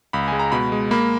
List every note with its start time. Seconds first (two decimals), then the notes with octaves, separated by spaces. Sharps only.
0.13 C#2 B5
0.28 G#3 G#5
0.40 A#5
0.52 B2 B5
0.72 G#3
0.91 A#3 B5